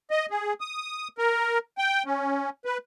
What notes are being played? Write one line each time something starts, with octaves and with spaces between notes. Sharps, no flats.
D#5
G#4
D#6
A#4
G5
C#4
B4